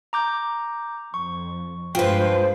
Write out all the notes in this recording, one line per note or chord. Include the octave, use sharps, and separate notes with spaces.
A#5 D6 G6
F2 C#6
G2 F3 G#3 B4 C5 F5 G5